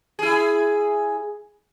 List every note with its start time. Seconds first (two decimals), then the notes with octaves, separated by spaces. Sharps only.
0.19 E4 G#4